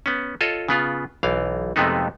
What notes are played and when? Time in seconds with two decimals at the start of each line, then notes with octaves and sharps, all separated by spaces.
0.06 B3 C#4
0.41 F4 A4 C#5 D#5
0.68 C#3 B3 F4
1.23 B1 E3 F5
1.76 F2 C3 G#3 A3 B3 D#4